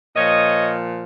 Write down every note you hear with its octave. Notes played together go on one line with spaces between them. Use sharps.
A#2 F3 C#5 D#5